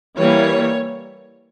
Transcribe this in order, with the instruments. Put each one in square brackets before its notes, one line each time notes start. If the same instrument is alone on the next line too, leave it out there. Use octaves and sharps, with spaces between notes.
[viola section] E3 G3 A#3 C#5